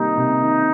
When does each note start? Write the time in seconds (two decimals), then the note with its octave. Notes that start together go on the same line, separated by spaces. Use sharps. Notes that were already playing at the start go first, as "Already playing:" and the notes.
Already playing: C3 D#3 G3 A#3 D#4
0.17 C3
0.41 D#3